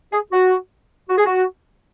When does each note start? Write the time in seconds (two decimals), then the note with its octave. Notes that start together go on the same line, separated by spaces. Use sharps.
0.13 G#4
0.32 F#4
1.10 F#4
1.18 G#4
1.26 F#4